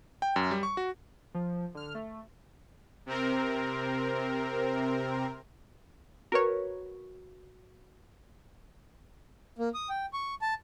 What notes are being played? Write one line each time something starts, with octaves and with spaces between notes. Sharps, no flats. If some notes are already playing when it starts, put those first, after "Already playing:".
G5
F#2
G3
C#6
F#4
F3
D3 F6
A3
C3 C4 A#4
F#4 A#4 B4 C#5
A#3
D#6
G5
C#6
A5